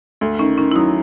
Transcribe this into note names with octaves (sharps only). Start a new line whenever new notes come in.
D2
D#3 C#4
D#3 C#4
E4
F#3 D#4